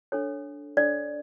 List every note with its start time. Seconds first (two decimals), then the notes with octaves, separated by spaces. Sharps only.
0.12 D4 A4 C#5
0.77 D4 A4 C#5 D5